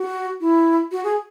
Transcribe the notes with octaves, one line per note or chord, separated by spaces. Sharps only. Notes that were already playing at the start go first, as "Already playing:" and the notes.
Already playing: F#4
E4
F#4
G#4